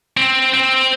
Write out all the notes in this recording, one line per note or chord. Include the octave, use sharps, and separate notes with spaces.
C4
C4